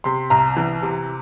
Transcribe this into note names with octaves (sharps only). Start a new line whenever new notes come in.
C3 C6
C2 A#5
E3
C3